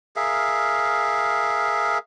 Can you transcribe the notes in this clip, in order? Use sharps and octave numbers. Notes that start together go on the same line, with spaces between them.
G#4 A#4 E5 F5